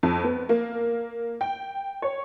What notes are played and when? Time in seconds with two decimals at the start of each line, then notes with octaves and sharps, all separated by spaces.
0.03 F2
0.24 B3
0.49 A#3
1.41 G5
2.02 C#5